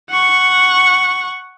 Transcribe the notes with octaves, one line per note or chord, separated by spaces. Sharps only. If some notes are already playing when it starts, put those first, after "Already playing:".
F#5 C#6